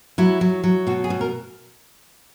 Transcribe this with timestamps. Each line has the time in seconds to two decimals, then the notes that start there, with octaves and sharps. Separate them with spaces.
0.18 F#3 E4
0.41 F#3
0.64 F#3
0.87 B2 F#4
1.04 G#4
1.10 B2
1.21 A#4